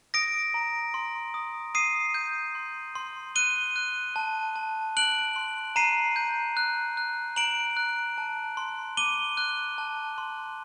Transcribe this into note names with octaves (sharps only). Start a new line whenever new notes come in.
D#6 A#6 D7
A#5
C6
D#6
D#6 C7 D#7
G6
C6
C6
F#6 D#7 G7
F#6
A5
A5
F#6 D7 F#7
C6
A#5 C7 D#7
G6
F#6
F#6
A#5 D7 F#7
F#6
A5
C6
D6 D#7 G7
F#6
A5
C6